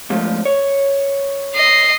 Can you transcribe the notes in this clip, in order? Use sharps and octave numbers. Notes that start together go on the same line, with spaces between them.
G#2 F3 A3
C#5
D#5 C7